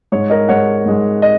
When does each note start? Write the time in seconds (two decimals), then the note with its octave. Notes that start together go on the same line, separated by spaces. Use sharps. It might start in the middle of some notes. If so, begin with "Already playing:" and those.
0.12 G#2 G#3 C#5
0.30 A#4 D#5
0.48 G#2 G#3 C#5 F#5
0.86 G#2 G#3
1.22 D#5